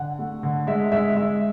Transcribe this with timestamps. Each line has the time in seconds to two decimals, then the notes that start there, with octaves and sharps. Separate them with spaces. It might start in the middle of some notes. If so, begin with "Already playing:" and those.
Already playing: D3 F#5
0.19 A3
0.43 D3
0.67 G#3 E5
0.92 G#3 E5
1.16 G#3 E5